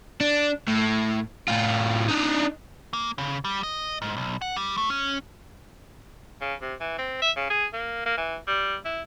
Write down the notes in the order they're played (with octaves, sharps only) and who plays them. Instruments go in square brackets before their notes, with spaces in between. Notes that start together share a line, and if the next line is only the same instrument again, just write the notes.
[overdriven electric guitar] D4
A2
A2 F4
D4 D#4
[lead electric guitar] A#3
C#3
G3
D#5
G#2
B1
F#5
G3
A3
C#4
[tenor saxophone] C#3
C3
E3
C4
E5
C#3
G#4
A#3
A#3
E3
G3
E4